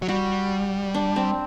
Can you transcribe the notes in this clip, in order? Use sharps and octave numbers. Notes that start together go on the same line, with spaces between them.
F#3
G3 F#4
D4
C4